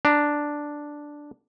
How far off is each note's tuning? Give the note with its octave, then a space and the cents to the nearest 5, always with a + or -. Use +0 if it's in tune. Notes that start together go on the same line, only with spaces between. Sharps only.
D4 +0 A#5 +0